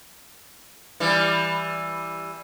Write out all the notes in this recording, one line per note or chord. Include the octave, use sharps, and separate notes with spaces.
E3 G3